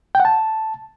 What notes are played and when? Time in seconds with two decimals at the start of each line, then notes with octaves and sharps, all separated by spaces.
0.15 G5
0.20 F#5
0.25 A5